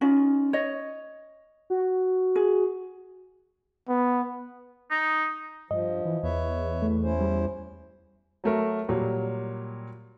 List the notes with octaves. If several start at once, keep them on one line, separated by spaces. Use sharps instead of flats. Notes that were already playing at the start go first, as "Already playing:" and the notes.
C#4 D#4 F4
C#5 D#5
F#4
G#4
B3
D#4
G2 F3 D#5
E3
E2 B4 C#5 E5
A3
C#4 E4 C5
G3
F#3 A3 A#4
A#2 F#3 G3